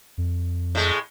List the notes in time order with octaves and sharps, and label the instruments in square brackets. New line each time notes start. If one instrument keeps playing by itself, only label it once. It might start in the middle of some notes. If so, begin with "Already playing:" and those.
[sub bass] F2
[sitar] A2 G#3